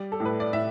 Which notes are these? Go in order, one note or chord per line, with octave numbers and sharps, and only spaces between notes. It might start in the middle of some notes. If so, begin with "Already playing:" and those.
Already playing: G3 D5
A4
A2
B4
D5
A2 E5